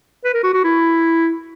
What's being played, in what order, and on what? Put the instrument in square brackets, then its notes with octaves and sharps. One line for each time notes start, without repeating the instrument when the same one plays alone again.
[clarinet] B4
A#4
F#4
F#4
E4